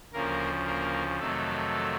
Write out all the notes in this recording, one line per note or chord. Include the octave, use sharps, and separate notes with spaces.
D2 C#3 F3 A#3 A#4
A#3 A#4
F2 C3 D#3 F#3 A3 A4